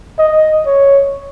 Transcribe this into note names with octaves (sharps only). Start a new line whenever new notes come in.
D#5
C#5